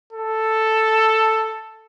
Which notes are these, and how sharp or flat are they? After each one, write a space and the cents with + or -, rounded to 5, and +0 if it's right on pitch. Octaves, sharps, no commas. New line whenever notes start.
A4 +5